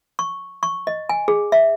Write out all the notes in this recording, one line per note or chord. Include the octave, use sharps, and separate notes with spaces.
C#6
C#6
D#5
G#5
G#4
E5